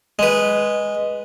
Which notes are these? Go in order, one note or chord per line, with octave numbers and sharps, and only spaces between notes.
G#3 B4